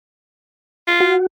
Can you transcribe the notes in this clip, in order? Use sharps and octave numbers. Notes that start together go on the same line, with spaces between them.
F4
F#4